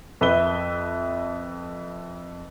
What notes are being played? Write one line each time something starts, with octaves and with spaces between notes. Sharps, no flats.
F2 B4 E5 G7